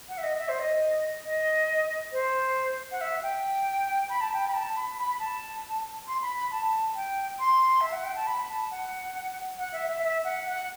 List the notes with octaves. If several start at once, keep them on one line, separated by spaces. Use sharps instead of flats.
F#5
E5
D#5
E5
C5
D#5
D#5
C5
F#5
E5
G5
B5
A5
G5
B5
A5
B5
B5
A5
C6
B5
B5
A5
G5
C6
E5
F#5
G5
A5
B5
A5
F#5
F#5
E5
E5
E5
F#5
F#5